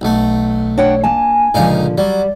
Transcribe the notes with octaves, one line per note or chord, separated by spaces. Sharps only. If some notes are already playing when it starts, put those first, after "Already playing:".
B1 A3
D4 C#5 F#5 G5
A#3 G#5 A5
C#2 A#2 D3 F3 D#4 F5
F#3 G3 D5